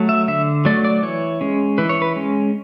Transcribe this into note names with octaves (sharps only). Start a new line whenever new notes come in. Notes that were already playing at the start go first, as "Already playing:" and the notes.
Already playing: F#3 A3
E5
D3 E5
F#3 A3 D5
D5
E3 C#5
G#3 C#4
E3 B4
C#5
B4
G#3 C#4